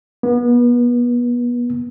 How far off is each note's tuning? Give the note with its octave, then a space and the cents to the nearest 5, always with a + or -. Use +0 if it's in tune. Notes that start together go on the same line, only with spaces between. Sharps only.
B3 -30